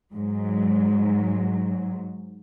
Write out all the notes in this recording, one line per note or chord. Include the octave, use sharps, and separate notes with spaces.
G#2 F#3